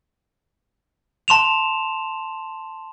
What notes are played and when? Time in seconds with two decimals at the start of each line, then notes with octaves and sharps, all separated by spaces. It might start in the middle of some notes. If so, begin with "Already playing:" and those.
1.28 A5 C6 E7 F7